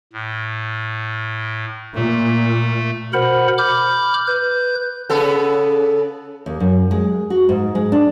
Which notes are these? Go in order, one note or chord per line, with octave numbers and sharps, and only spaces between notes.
A2
A#2 A3
B2 A#4 C5 F#5 B5
B5 D6 F6 G6
B4 G6
C#3 B3 A4
D#2
F#2
G#3
F#4
G#2
G#3
D4